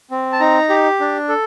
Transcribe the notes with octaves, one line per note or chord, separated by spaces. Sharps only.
C4
A5
D#4 A#5
G4
D4
A4